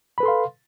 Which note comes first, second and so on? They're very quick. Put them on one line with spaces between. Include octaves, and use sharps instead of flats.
B5 B4 A4 C6 F5